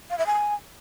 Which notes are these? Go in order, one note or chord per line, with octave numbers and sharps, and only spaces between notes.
F5
E5
G#5